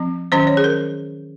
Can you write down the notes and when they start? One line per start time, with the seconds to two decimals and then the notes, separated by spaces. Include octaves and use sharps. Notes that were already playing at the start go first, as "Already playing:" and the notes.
Already playing: F3 C4
0.32 D#3 F#3 C#4 C5
0.47 C#5
0.57 G#4
0.64 A#4